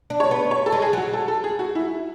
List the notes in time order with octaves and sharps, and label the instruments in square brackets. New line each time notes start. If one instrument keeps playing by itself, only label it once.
[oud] D4
[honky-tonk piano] C#5
[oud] B3
[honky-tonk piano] C#5
A4
[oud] G#3
[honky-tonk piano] G#4
[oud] F#3 [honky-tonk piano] F#4
[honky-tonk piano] A4
A4
G#4
F#4
E4